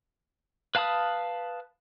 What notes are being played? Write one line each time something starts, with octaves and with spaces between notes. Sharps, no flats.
B4 F5 A5 B5 D#6